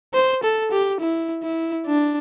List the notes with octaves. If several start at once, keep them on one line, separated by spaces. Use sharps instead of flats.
C5
A4
G4
E4
E4
D4